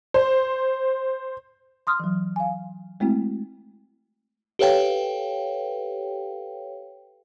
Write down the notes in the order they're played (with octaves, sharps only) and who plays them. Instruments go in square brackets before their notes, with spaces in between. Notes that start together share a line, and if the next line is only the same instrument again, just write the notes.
[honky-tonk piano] C5
[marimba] C6 D#6 F6
E3 F#3
F5 G#5
G#3 A3 C4 E4 F#4
[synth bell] G4 A4 B4 C#5 F5 G5